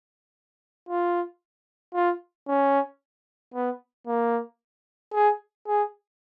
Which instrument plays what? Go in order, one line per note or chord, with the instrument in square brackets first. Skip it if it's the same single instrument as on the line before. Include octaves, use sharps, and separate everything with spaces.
[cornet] F4
F4
C#4
B3
A#3
G#4
G#4